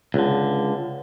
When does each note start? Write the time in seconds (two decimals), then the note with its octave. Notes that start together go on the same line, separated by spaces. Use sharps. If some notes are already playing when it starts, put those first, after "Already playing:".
0.14 C#2 D3